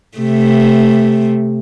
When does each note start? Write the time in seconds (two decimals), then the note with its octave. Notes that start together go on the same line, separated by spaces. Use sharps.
0.18 C3 A3